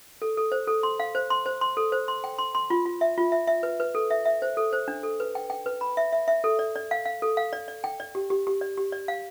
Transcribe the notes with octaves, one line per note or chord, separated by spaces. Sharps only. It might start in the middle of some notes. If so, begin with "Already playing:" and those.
A4
A4
C5
A4
C6
F5
C5
C6
C5
C6
A4
C5
C6
G5
C6
C6
F4
F4
E5
F4
E5
E5
B4
B4
A4
E5
E5
C5
A4
C5
D4
A4
B4
G5
G5
B4
B5
E5
E5
E5
A4
D5
D5
F5
F5
A4
F5
D5
D5
G5
D5
G4
G4
G4
D5
G4
D5
F5